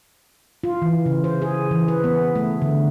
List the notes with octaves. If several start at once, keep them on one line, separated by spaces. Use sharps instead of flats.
F4
E3
C#3
C5
G#4
E3
B4
B3
A3
D3